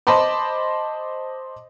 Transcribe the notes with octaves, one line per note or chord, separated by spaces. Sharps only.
C5 D#5 A5 B5 C6 D6